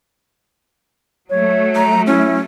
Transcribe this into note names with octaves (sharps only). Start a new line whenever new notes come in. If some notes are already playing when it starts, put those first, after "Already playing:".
F#3 A3 C#5
A#5
C#4 E4